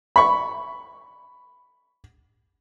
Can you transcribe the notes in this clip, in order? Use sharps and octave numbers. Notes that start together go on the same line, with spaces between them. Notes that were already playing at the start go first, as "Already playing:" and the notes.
B5 C#6